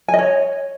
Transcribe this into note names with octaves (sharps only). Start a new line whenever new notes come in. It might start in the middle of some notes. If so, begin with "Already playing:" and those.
G#5
D#5
C#5